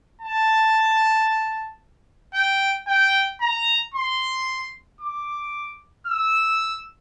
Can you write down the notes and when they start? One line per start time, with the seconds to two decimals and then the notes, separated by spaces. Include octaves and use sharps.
0.21 A5
2.34 G5
2.87 G5
3.41 A#5
3.94 C6
5.01 D6
6.07 E6